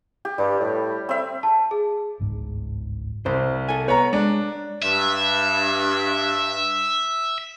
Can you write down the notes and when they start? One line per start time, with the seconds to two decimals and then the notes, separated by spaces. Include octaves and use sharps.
0.25 G4
0.38 G2 G3
0.59 A2
1.09 C4 E5
1.43 A5
1.71 G#4
2.19 G1 C#2 G#2
3.26 C2 C5
3.69 A4 G#5
3.88 B3 B4 C#5 A#5
4.13 G#3 D4
4.83 G2 E5